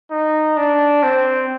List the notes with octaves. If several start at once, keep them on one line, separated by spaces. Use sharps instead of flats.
D#4
D4
C4